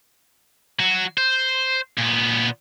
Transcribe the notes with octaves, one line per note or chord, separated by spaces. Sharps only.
F#3 F#4
C5
A#2 B3